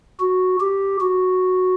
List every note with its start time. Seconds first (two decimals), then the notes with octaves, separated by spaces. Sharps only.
0.20 F#4
0.61 G4
1.01 F#4